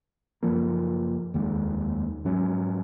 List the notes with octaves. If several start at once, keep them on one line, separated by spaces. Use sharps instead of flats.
F#1 F2 F3 A#3
F1 D#2 D#3 G#3
G#2 F#3 C#4